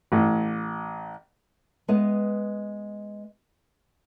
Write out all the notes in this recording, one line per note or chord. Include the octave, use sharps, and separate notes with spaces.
A1
G#3 B3 D#5